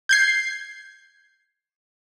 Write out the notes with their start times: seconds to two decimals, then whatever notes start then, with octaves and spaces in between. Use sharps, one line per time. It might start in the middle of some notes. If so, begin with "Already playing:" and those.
0.09 G6 G#6 C7